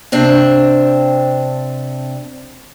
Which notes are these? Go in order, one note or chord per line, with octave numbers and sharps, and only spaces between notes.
C3 C4 D4